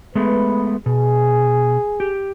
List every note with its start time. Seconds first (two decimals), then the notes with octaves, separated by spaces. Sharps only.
0.15 G#3 A3 B3 B4
0.86 B2 G#4
2.00 G4